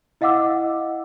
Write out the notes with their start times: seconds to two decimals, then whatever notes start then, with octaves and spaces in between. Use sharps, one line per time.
0.21 E4 D#5 F5 F#5 D6 E6